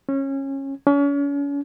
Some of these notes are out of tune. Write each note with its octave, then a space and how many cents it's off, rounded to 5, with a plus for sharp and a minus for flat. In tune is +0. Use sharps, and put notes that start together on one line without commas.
C#4 -20
C#4 +40